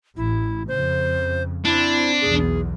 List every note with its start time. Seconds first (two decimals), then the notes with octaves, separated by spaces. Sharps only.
0.17 A1 E4
0.68 F2 C#3 C5
1.65 C4 D4 E4
2.22 B1 E2 G#4